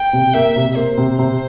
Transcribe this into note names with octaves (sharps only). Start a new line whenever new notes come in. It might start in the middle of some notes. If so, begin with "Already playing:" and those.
Already playing: G5
C3
A#3 E5
C3
A#3 C5
C3
C3